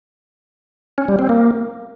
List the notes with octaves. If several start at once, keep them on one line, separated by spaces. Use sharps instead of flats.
C#4
G3
C4
A#3